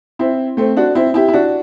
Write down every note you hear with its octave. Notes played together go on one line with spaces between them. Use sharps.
C4 E4
A3 C4
D4 F#4
C4 E4
E4 G4
E4
D4 F#4